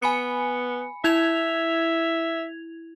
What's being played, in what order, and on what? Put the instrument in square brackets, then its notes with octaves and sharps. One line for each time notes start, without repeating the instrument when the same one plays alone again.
[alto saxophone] B3 [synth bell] G#5 B5 C#7
[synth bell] E4 G#6 F7 [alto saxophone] E5